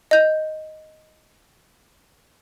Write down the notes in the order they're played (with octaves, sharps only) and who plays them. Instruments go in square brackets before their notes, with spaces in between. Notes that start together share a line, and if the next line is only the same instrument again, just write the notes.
[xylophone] D#5 G6